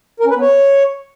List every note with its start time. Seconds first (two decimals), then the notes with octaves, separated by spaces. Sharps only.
0.20 A#4
0.25 C#4
0.31 B4
0.36 B3
0.41 C#5